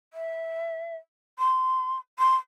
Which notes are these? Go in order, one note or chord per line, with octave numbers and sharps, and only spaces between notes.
E5
C6
C6